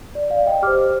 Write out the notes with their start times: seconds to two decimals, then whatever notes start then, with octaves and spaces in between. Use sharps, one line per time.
0.15 D5
0.30 D5 F5
0.46 D#5 G5
0.62 G4 D6 F6
0.67 C5